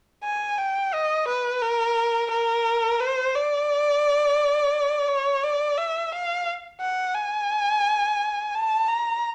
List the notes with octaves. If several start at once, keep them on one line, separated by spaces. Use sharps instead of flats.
G#5
G5
D#5
B4
A#4
A#4
C5
D5
C#5
D5
E5
F5
F#5
G#5
A5
A#5